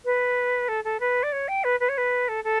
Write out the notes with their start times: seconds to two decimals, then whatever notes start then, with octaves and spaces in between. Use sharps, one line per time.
0.05 B4
0.68 A4
0.84 A4
1.00 B4
1.23 D5
1.32 C#5
1.48 G5
1.64 B4
1.80 B4
1.89 C#5
1.97 B4
2.28 A4
2.44 A4